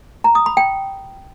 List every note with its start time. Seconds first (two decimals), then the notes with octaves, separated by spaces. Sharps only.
0.24 A#5
0.35 D#6
0.46 B5
0.57 G5